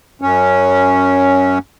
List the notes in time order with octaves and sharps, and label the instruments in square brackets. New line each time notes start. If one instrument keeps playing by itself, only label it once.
[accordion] F#2 C#4